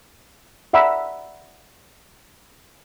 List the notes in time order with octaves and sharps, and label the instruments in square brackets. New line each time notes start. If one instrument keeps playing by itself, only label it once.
[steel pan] D5 E5 F#5 A#5 B5 E6